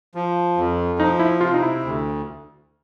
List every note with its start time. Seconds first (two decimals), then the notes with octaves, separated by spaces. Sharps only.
0.15 F3
0.57 F2
0.99 F3 D#4
1.19 E4
1.41 C3 F4
1.54 D#4
1.62 E4
1.84 D2